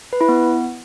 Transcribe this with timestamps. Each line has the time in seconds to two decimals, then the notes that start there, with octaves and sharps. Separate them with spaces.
0.13 B4
0.21 E4
0.29 B3